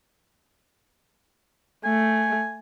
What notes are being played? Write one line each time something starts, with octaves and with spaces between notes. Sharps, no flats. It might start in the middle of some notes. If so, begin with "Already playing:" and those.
A3 G#5